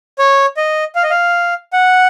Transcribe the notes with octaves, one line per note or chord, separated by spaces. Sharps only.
C#5
D#5
F5
D#5
F5
F#5